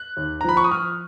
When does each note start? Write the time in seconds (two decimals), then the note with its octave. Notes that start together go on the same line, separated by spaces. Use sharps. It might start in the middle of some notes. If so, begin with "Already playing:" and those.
Already playing: F#6
0.17 D#2
0.41 A#5
0.44 F3 B5
0.57 C#6
0.64 D#6
0.71 F3 F6